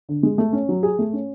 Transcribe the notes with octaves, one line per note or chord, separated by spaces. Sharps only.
D3
G#3
A3
C#4
F#3
G#4
A3
C#4